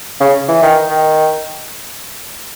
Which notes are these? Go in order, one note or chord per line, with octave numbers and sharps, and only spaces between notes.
C#3
E3
D#3
D#3